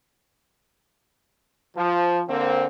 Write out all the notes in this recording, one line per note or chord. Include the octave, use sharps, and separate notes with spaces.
F3
D3 A#3 C4